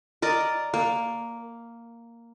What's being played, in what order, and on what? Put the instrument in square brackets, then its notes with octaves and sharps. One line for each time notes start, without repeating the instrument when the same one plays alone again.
[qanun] A#4 D5 D#5
A#3